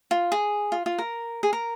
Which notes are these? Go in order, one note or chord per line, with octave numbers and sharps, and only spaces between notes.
F4
G#4
F4
F4
A#4
G#4
A#4